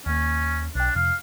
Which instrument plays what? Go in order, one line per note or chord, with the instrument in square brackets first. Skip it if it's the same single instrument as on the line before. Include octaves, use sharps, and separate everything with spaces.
[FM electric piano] D#2 A#3 [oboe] C#4
[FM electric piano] B1 G5 [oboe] D4
[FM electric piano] F2 C3 [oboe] F5